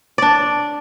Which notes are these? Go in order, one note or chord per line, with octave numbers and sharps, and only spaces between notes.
D4 D5